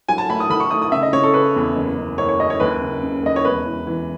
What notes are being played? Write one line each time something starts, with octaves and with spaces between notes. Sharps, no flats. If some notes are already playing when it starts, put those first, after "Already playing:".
F#3 G#5
A5
A3 B5
D#6
D#3 B5
C#6
A3 D#6
D#6
C#3 E5
D#5
C#3 C#5
A4
C#3 B4
E2
F#1
F#1
F#1 C#5
C#5
F#2 D#5
C#5
D#2 B4
C#3
C#3
D#2 D#5
C#5
E1 B4
E3
E3